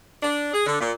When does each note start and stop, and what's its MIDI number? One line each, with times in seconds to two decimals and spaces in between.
0.23 0.51 62
0.53 0.64 68
0.66 0.76 50
0.80 0.92 46